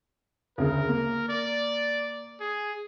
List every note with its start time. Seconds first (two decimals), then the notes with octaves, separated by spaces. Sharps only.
0.58 D2 C#3 A#4
0.89 A#3
1.29 D5
2.40 G#4